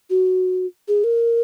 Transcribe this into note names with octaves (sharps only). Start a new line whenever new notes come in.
F#4
G#4
A#4